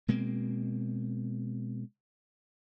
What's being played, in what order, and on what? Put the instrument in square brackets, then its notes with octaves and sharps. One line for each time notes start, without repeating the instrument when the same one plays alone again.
[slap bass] B2 G#3 A#3 C4